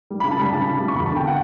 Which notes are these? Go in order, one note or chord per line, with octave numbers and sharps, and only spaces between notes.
G3
B5
C#3
A5
G3 B5
C#3 A5
C#3
G3
C#6
E2 B5
A5
D3
G5
F#5